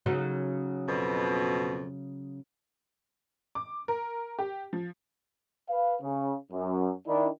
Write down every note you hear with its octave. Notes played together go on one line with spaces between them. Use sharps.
C#3 F#3 D#4
F2 B2
D6
A#4
G4
F3
B4 F5
C#3
F#2
D#3 D4 E4